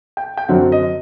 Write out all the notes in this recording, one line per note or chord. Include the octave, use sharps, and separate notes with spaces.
G5
G5
F#2 D3 F#3 C4 F#5
D#5